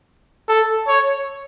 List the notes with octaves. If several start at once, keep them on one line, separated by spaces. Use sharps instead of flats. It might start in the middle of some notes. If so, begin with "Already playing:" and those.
A4
C#5